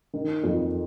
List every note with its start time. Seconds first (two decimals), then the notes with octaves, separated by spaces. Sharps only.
0.13 D#3
0.44 F2